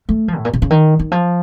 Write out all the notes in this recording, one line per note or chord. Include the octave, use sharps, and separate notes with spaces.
A3
F3
A2
A#2
C3
C#3
D#3
D#3
F3